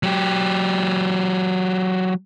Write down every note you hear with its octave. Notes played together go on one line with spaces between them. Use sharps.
F#3 G4